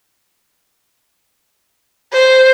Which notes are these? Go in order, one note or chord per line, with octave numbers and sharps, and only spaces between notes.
C5